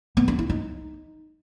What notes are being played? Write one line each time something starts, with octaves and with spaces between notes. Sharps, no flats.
B3
D4
E4
D#4